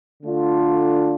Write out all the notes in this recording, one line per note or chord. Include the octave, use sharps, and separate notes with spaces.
D3 A3 D4 F4